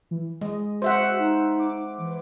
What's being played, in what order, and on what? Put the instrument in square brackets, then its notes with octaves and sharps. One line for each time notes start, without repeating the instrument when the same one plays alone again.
[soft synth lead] E3
[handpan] G#3 [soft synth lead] D#5
[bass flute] F#4 [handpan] C5 E5 F#5
[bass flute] D#4
[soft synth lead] D6
[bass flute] E3